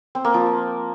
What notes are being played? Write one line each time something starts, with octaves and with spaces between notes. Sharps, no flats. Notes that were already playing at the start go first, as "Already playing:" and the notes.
C4
A#3
F3